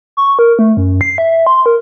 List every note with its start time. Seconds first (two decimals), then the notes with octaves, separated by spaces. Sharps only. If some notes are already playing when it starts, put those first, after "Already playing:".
0.17 C#6
0.39 A#4
0.59 A3
0.77 F#2
1.01 C7
1.18 E5
1.47 C6
1.66 A#4